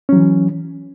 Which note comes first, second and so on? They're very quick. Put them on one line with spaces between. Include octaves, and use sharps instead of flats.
C#4 F#3 E3